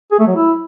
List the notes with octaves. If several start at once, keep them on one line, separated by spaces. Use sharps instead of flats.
G#4
A3
F#3
E4